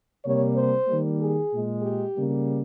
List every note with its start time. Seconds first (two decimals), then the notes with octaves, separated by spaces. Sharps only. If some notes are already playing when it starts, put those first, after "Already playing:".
0.25 C3 G3 A#3 C#5
0.56 C5
0.88 D#3 G3 A#3
1.20 G#4
1.52 A#2 G#3
1.83 G4
2.15 C#3 G3 A#3